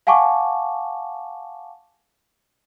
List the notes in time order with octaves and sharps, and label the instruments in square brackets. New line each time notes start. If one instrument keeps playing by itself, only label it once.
[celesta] F5 F#5 G#5 A5 C#6 D6